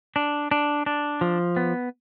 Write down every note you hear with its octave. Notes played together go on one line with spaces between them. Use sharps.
D4
D4
D4
F3
B3